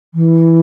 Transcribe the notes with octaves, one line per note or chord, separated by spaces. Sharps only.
E3